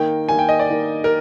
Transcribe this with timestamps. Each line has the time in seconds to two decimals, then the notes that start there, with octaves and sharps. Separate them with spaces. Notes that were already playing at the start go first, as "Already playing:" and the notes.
Already playing: D#3 A#3 D#4 G5
0.28 D#3 A#3 D#4 G#5
0.39 G5
0.49 D#5
0.60 D5
0.70 D#3 A#3 D#4
1.04 A#4